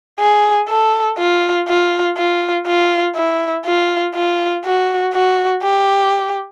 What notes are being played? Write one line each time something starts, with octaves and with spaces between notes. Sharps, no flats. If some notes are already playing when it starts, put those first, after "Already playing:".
G#4
A4
F4
F4
F4
F4
E4
F4
F4
F#4
F#4
G4